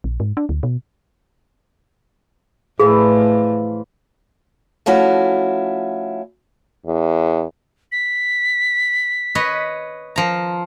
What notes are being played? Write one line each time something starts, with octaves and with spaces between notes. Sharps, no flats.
A#1
G#2
D4
D2
B2
A2 E3 F3 G#4 D5
F3 A3 C#4 E4 F#4
E2
B6
B4 C#5 D#5
F3 A#5